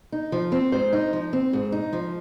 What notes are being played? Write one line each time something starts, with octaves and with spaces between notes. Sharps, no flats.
D#4
F3
C4
G#2 C5
D#4
F3
C4
G#2
D#4
F3